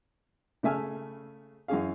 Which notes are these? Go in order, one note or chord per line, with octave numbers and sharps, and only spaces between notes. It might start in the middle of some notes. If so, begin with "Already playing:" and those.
C#3 A3 E5 G#5 F6
F#2 E3 C#4 G#4 F5